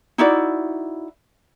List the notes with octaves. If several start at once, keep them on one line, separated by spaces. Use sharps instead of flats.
D#4 E4 F#4 D5